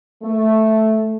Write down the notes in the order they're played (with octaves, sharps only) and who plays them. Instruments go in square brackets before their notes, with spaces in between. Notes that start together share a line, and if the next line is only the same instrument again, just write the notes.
[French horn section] A3